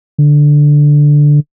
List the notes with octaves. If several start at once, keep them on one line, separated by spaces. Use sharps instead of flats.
D3